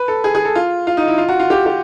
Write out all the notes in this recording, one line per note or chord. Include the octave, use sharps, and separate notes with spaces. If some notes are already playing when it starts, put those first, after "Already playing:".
Already playing: B4
A4
G#4
G#4
A4
F4
F4
D#4
E4
F4
F#4
F4
G4
G4